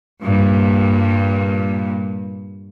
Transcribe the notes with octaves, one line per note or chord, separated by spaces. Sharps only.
G2 A#2